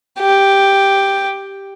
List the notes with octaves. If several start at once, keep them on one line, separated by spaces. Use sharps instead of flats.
G4